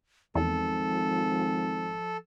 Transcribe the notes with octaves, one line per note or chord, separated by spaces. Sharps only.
G#1 E2 F3 A4